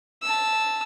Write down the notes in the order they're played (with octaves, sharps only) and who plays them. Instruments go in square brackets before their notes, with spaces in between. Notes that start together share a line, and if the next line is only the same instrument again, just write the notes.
[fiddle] A5 E6